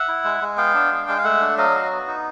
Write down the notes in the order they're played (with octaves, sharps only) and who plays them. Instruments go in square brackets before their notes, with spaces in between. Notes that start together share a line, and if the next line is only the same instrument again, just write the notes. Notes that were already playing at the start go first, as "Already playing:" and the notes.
Already playing: [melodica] E5 F#5
E4
G#3
G#3
B3 F5 G5
D4
G#3
G#3
F5
A3 E5 F#5
D4
F#3 D#5 F5
F#4
B3
D#4